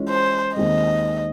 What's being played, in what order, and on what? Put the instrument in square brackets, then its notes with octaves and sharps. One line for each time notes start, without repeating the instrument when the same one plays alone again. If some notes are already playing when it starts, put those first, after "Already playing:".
Already playing: [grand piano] E3 G#3 C#4 F4
[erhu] C5
[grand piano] D#2 D#3 G#3 C4 [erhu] D#5